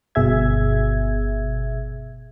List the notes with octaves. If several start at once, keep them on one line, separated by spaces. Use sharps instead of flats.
G1 B2 G#4 E5 G#6